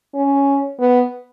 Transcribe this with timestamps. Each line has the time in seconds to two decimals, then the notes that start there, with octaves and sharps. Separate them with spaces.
0.14 C#4
0.80 B3